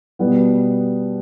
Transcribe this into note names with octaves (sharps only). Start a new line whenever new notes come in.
B2 G3 B3